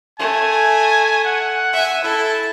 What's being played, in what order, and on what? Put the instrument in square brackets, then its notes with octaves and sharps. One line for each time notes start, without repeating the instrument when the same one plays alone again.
[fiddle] A3 [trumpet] G#5
[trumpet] F#5
[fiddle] E5 G#5
[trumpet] E4 [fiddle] A4